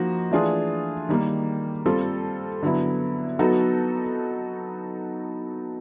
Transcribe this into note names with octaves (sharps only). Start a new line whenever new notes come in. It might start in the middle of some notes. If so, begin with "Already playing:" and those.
Already playing: F3 A#3 D#4 F#4
E3 A3 D4 F4 G#4
D#3 G3 A#3
G3 C4 F4 A4
D3 F#3 B3 E4
F#3 B3 D#4 F#4 A4